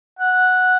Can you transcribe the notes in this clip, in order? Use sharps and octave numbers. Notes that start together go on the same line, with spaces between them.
F#5